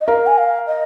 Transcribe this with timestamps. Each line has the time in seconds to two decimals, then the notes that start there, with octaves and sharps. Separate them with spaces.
0.01 D#5
0.08 A#4 F5
0.27 G#5
0.38 F5
0.67 D#5